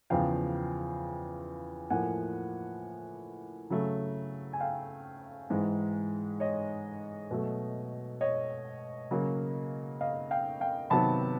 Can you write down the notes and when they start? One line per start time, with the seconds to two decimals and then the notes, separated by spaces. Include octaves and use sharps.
0.10 E2 C#3 F3 F5 G5
1.90 A2 F3 A#3 F#5 G#5
3.70 C#3 F#3 A3
4.53 G#5
4.60 F5 G5
5.50 G#2 E3 G#3
6.40 C#5 D#5
7.31 B2 F#3 A3
8.21 C#5 D#5
9.11 C#3 F#3 A#3
10.01 D#5 F5
10.31 F5 G5
10.61 F5 G5
10.90 C3 D#3 F#3 B3 A5 B5